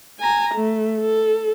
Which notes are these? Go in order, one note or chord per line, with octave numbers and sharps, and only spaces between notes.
G#5 A#5
A3
A4